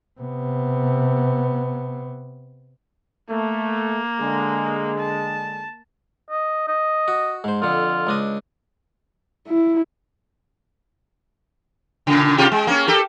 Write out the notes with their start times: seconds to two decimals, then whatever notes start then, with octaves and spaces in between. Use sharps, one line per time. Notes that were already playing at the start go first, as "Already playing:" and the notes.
0.21 C3 B3
3.30 A3 A#3
4.20 D3 G#3
4.99 A5
6.31 D#5
6.68 D#5
7.08 F#4
7.44 G#2 C5
7.62 F2 D3 F4
8.07 C#2 D4 D#5
9.48 E4
12.07 A#2 C#3
12.38 C3 F4 G4
12.52 G#3
12.67 A#3 C#4
12.88 G4 A4 A#4